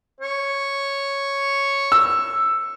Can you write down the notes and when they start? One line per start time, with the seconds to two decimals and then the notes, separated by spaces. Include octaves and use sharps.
0.20 C#5
1.92 E6